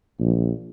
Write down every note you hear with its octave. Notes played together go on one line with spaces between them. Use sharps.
A#1